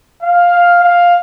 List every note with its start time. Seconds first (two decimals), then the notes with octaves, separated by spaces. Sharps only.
0.23 F5
0.84 F5